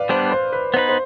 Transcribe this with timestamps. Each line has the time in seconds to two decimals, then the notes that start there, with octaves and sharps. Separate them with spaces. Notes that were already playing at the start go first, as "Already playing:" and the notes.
Already playing: B4 D5 F5
0.09 G3 B3 D4 C5
0.31 C5
0.52 B4
0.74 B3 D#4 B4 C5
0.89 C5